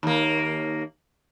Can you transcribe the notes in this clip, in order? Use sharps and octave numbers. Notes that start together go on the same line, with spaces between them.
D#2 A#3